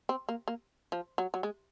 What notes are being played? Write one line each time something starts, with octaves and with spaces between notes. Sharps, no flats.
C4
A#3
A#3
F3
F#3
F#3
G#3